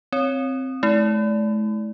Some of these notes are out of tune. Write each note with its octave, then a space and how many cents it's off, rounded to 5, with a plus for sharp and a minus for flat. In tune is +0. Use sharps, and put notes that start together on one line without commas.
C4 +0 C#5 +0
A3 -45 E4 -25